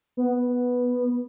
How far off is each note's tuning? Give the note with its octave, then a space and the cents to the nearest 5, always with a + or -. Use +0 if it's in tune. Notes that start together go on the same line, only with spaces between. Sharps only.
B3 -5